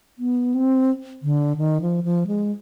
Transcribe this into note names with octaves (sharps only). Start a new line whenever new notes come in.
B3
C4
D3
D#3
F3
F3
G#3